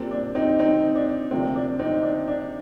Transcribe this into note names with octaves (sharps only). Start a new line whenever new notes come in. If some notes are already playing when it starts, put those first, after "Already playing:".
Already playing: A#2 G3 A#3 C4
D4
C4 D#4
C4 D#4
D4
D2 C3 F3 A#3 C4
D4
C4 D#4
D4
D4